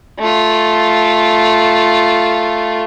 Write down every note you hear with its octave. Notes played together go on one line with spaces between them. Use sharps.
A3 F4